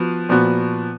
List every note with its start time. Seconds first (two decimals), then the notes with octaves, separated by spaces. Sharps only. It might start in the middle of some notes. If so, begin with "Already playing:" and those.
Already playing: F3 B3 F#4
0.29 A#2 F3 B3 F#4